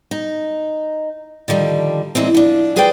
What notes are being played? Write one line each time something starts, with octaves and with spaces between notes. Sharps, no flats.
D#4
D3 D#3 F3 G3
A#2 E3 G#3 C4
F3 D4
F4 G#4 B4 C5 D5 G5